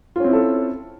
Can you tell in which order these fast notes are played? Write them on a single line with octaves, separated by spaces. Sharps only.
F4 C#4 C4 E4 A4